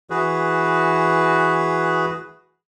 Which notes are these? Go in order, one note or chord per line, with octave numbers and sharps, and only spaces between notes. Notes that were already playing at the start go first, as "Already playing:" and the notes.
E3 F#4 G#4 B4